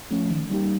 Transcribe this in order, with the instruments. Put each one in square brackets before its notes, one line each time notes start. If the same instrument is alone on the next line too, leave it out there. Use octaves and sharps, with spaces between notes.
[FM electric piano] F3 A3 C#4
D#3
G3 A#3 D#4 G4